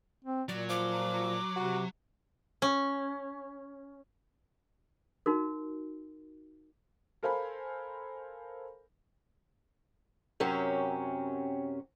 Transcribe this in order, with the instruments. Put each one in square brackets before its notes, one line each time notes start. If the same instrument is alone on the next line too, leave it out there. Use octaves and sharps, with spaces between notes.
[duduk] C4
[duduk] A#2 [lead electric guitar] F#3 [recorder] D5
[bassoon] F3 [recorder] D6
[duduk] C3 [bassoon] F#4
[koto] C#4
[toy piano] D#4 F#4 A#4
[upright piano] A4 A#4 C5 F5 G#5 B5
[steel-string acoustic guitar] F#2 C3 F#3 C#4 G4 A#4